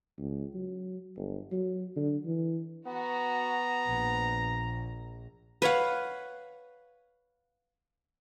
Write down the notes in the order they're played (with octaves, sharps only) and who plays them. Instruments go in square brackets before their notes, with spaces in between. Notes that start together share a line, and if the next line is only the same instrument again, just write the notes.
[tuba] C#2
F#3
G1
F#3
D3
E3
[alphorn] B3 [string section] F#4 [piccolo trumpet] A#5
[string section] A#1
[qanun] B4 C#5 F5 F#5